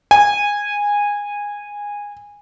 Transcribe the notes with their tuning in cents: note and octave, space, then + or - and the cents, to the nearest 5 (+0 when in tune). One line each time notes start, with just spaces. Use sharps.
G#5 -15